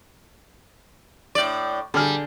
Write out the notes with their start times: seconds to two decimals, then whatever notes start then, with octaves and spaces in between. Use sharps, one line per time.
1.35 A2 D5
1.94 D3 G3 G#4 F6